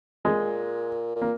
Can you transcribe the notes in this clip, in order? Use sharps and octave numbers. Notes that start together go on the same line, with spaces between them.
A#2 G#3
A#2
A#3